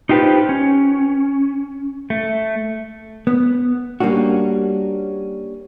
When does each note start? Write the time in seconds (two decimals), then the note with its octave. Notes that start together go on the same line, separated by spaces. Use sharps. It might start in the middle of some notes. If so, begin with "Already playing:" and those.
0.09 D#4 F4 G4 A4 B4 C5
0.49 C#4
2.10 A3
3.27 B3
4.00 G3 A#3 C#4 D4 F#4